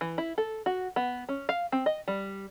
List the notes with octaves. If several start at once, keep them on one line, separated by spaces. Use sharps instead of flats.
E3
E4
A4
F#4
B3
C#4
F5
C4
D#5
G3